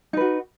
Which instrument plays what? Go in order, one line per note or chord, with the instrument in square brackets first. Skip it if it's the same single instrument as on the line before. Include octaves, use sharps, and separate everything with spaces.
[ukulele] D#4
B4
F#4